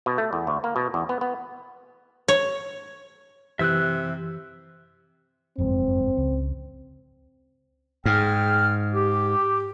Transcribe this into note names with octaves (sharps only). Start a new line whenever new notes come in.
B2
A3
E2
D2
A#3
B2
E2
B3
B3
C#5
F#2 C3 E3 E5 E6 F#6
F#1 F2 G#2 C4
C#2
G#2 G#4 G5 F6
G4